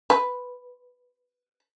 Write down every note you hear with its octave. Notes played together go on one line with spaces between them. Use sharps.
B4